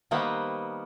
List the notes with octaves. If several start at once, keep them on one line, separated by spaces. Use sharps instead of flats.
D#3 G3 A#3 B3 B4 C5